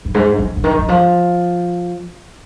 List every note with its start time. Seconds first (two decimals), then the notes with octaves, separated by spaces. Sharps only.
0.05 F2
0.14 G#2
0.39 F2
0.57 C#3
0.64 D#3
0.78 D#3
0.88 F3